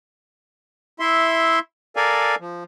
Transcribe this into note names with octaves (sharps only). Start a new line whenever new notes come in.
E4 E5 C6
A4 A#4 D5 F5 G#5
F3